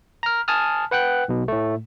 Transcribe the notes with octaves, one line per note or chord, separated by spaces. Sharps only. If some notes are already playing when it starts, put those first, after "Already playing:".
A#5 F6
G#5 A5 D#6 F6
B4 F#5 G5 F#6
B1 B2
A2 A3